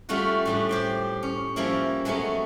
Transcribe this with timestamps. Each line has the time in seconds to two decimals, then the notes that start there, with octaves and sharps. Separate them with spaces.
0.09 G3 A3 C#4 F4 F#4
0.45 A2 G3 D4
0.69 G4 C5 G5
1.23 C#4
1.56 F3 G3 A#3 C#4 E4
2.05 F#3 G#3 A3 B3 C#4